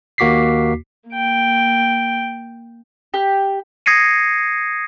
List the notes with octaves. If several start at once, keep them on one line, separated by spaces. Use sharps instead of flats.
D#2 A#3 F#4 D6 B6 C7
A#3 G5
G4
D#6 G#6 A#6 C7 C#7 D#7